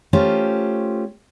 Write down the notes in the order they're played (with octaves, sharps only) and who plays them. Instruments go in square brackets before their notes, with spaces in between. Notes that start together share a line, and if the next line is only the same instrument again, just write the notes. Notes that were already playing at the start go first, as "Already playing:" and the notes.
[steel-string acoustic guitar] A3 C#4 F4 G4 C5